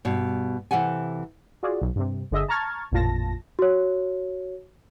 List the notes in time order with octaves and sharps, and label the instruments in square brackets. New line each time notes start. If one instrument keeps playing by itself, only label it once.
[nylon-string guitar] G2 B2
C3 E3 A4 F#5 G#5
[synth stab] F4 F#4 G#4 D5
B1
G2 C3
G1 D3 G#4 D#5 E5
A5 A#5 C#6 F6 G#6 A6
A1 F2 A#2 F4 A5 A#6
[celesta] F#4 C#5